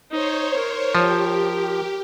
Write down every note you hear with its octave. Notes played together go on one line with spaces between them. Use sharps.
D#4 C5 C#5
A#4
F3 G4